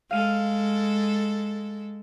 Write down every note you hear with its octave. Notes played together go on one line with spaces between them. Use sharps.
G#3 A4 F5 D#7